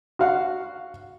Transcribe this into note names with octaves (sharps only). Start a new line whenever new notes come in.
F#4 F5 F#5